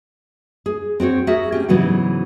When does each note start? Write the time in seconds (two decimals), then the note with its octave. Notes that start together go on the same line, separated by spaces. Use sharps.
0.66 G#4
1.00 C4 F#4 C5 C#5
1.27 F#4 G#4 A#4 E5
1.52 C4 C#4 G4
1.69 G#2 C#3 E3 F#3 B3 F#4